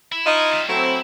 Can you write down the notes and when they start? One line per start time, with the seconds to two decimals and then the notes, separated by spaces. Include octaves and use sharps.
0.12 E4
0.26 D#4 F4 D#5
0.53 G3 E4
0.69 F#3 A3 C4 E4